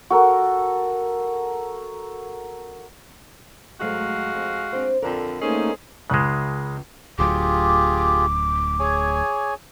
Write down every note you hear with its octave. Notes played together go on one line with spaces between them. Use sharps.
F#4 A4 A#4
G#2 F#3 G#3 A3 F#4 F5
F2
C4 D4 C5
F2 D3 A#4
A3 A#3 C#4 D#4 G#4 C5
C#2 C#3 G#3 F#6
D1 D2 F#3 F4 G4 G#4 D6
G#4 C#5 G#5